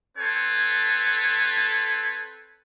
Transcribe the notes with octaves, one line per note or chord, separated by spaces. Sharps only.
C4 A4 B4 C#5